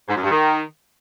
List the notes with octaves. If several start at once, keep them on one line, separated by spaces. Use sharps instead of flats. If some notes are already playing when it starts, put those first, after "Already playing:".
G#2
F#2
G2
D#3